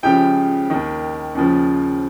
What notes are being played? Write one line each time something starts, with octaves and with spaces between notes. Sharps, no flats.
C#2 C#3 F3 G4 G5
D#2 D#3
D#2 C#3 F3